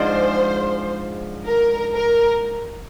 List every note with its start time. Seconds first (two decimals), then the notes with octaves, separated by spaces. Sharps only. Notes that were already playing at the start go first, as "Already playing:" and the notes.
Already playing: G#2 F3 G#3 D4 C5
1.46 A#4
1.93 A#4